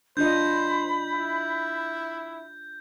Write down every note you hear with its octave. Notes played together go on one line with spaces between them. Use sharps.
D4 F4 C5 D#5 B5 G6
E4